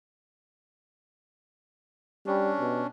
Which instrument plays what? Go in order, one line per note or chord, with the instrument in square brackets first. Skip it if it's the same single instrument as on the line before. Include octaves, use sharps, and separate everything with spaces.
[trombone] G3 [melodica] C#4 D4
[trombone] B2